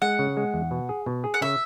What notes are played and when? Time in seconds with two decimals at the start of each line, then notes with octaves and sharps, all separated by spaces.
0.02 G#3 F#5
0.19 C#3
0.37 G#3
0.54 E2
0.71 B2
0.89 G#4
1.06 B2
1.24 G#4
1.34 F#5
1.41 C#3 E5